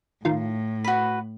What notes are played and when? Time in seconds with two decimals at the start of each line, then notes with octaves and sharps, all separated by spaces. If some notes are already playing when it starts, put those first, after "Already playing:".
0.25 A2 D#3 F4
0.84 F#4 B4 B5